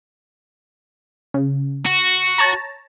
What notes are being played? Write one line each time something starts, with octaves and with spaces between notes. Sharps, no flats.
C#3
F#4
C#5 A5 A#5